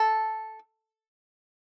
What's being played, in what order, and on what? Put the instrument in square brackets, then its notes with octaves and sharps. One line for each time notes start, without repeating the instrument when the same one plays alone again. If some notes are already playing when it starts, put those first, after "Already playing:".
Already playing: [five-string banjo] A4